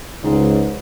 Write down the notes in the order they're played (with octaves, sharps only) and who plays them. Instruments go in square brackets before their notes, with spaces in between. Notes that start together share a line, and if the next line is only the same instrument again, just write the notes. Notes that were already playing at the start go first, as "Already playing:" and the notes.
[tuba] C#2 [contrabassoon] G#2